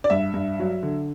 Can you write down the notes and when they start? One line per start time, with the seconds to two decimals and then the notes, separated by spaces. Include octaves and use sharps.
0.04 D5
0.10 G2 E5
0.34 G2
0.59 F#3
0.83 D3